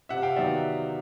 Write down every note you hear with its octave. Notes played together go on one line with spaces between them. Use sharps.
C3 E5 F#5
F5 G5
D#3 F#3 B3 D5 E5